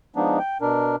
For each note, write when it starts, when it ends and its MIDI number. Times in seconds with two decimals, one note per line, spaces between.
0.16 0.39 53
0.16 0.39 56
0.16 0.39 59
0.16 0.39 62
0.16 0.39 63
0.39 0.58 79
0.61 0.96 47
0.61 0.96 62
0.61 0.96 70